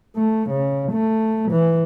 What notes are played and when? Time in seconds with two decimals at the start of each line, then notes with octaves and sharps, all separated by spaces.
0.17 A3
0.50 C#3
0.92 A3
1.52 E3